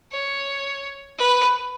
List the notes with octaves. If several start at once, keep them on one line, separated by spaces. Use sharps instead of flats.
C#5
B4